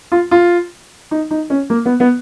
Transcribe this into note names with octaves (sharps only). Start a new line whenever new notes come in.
F4
F4
D#4
D#4
C#4
A#3
B3
B3